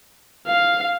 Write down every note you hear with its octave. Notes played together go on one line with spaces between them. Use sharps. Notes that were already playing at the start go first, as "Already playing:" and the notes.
F5